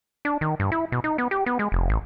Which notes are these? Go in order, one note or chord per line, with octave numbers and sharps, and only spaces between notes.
D4
D#3
G2
E4
B2
D#4
B3
G4
B3
G#3
F1
A1